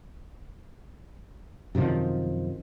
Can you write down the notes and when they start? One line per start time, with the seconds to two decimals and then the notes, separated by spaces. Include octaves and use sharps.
1.75 F#2 C3 D#3 F3